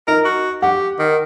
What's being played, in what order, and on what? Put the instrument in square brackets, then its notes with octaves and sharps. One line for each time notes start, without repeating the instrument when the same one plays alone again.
[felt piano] D#4 [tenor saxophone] A#4
[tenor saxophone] F#4
[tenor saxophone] G4 [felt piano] F#5
[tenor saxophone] D#3